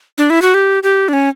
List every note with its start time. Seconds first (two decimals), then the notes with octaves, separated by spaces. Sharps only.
0.18 D4
0.30 E4
0.42 F#4
0.54 G4
0.83 G4
1.09 D4
1.13 C#4